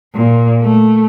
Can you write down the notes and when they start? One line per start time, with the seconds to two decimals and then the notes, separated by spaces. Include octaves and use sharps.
0.14 A#2
0.63 A3